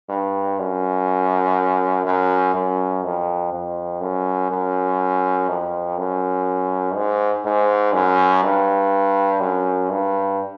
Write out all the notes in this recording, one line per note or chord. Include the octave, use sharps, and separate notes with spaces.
G2
F#2
F#2
F#2
F2
F2
F#2
F#2
F2
F#2
G#2
G#2
F#2
G2
F#2
G2